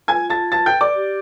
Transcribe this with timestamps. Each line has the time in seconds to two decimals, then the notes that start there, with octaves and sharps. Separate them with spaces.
0.08 F4 G#5 G#6
0.30 A5 A6
0.52 A5 A6
0.66 G5 G6
0.81 D5 D6
0.95 G4